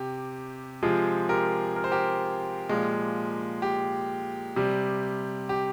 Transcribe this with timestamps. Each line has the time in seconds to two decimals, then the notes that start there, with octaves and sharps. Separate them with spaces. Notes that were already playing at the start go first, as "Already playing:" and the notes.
Already playing: C3 G4
0.83 C3 F3 G#3 F4 G#4
1.29 G4 A#4
1.76 A#4
1.84 C5
1.92 G4 A#4
2.69 A#2 F3 G#3
3.62 G4
4.56 C3 G3
5.49 G4